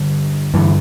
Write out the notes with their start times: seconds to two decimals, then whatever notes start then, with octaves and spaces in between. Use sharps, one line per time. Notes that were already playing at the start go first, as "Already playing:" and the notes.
Already playing: G2 D3
0.54 G2 D3 E3